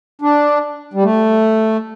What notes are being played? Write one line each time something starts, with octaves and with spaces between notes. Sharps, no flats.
D4
G3
A3